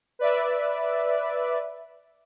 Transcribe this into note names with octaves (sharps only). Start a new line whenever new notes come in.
B4 D5 E5